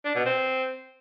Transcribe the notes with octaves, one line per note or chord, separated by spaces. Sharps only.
D4
B2
C4